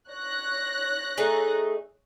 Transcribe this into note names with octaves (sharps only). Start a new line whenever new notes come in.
C#5 F#6 A#6
A3 D#4 G#4